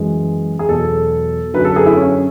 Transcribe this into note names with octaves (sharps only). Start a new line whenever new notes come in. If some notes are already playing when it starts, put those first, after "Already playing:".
Already playing: F#2 E3 G#3
G#4
E2 B2 F#3 A4
F#2 D3 F#3 B4
A4
G#4
E4
C#4